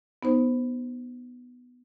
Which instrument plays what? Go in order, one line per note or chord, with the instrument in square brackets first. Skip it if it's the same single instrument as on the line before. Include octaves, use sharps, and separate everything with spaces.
[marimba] B3 D#4 C5